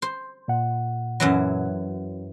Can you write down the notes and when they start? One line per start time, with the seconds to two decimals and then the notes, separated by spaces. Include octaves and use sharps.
0.02 C5
0.48 A#2 F#5
1.20 F#2 E3 F#3